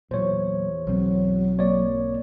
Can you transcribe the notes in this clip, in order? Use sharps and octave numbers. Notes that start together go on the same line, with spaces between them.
E2 A#2 F#3 C5 C#5
B1 G#2 F#3 C4
A#3 C#5 D5